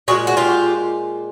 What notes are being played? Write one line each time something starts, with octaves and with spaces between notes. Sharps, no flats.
A#2 F3 G#3 F#4 G#4
F#4 G#4
F4 G4